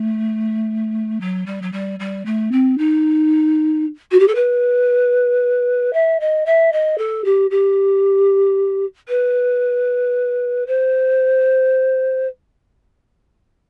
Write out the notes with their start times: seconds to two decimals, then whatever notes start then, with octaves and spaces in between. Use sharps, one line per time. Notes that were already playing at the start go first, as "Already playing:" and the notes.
Already playing: A3
1.20 F#3
1.46 G3
1.62 F#3
1.72 G3
1.99 G3
2.25 A3
2.51 C4
2.78 D#4
4.11 F#4
4.19 G4
4.28 A4
4.35 B4
5.93 E5
6.20 D#5
6.46 E5
6.72 D#5
6.98 A4
7.24 G4
7.50 G4
9.08 B4
10.67 C5